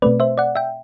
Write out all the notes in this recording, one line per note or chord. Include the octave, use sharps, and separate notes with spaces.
B2 A3 C4 B4 D5
C5 E5
D5 F#5
E5 G5